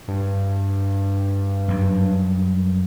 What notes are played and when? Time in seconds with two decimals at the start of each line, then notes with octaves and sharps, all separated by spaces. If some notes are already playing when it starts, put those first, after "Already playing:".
0.08 G2
1.68 F#2 G3